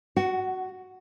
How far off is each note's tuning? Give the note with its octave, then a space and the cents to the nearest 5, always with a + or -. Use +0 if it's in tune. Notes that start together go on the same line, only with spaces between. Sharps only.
F#4 +0 F#5 +20